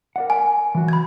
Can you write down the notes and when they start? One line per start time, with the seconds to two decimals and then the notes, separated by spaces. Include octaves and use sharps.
0.16 A#4 D5 F#5
0.30 G#5
0.75 E3 F#3 F#4
0.88 B5 G#6